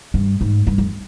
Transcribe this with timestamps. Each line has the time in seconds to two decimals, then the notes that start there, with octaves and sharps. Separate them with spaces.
0.14 G2
0.41 G#2
0.67 G2
0.78 F2